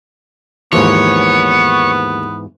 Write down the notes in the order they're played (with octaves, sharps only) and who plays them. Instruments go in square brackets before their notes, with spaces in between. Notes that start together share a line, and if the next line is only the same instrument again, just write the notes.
[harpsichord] D#2 F3 [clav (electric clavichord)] G#2 E3 [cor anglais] B3 [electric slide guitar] C#5